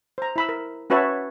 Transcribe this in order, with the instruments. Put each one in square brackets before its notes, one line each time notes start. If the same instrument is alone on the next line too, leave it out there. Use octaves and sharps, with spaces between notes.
[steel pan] C5 A#5
E4 B5 E6
A#4
C#4 F#4 B4 C#5 E5 A5